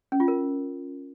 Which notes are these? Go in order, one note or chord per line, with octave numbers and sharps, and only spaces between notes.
C#4
F4
A#4